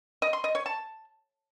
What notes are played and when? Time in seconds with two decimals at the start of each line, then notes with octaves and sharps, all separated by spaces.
0.22 D#5
0.33 C6
0.44 D#5
0.55 C#5
0.66 A5